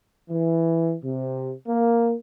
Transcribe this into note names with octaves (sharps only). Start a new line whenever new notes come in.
E3
C3
A#3